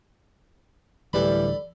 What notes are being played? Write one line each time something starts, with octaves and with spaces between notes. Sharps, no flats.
D1 E3 G3 A4 D5 B5